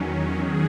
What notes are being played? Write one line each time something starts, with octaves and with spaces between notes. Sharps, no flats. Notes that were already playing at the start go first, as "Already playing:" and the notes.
Already playing: E2 D#3 F#3 C#4
G#4